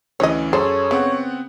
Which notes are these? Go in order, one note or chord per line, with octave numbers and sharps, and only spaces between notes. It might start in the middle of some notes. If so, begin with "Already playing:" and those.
D2 E3 C#4 C#5 D#5
F#2 G#4 A4 C5 C#5
C#3 B3 C4 F#5